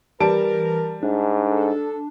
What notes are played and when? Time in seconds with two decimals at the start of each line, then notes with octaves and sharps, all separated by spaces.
0.20 E3 G3 A#4 A5 D7
1.03 G#2 D4
1.46 A4